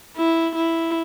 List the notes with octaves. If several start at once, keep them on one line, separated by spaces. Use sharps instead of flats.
E4
E4